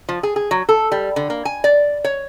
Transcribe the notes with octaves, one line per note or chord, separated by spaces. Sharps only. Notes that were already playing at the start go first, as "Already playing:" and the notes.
F3
G#4
G#4
F#3
A4
G3
D3
A#3
G#5
D5
C#5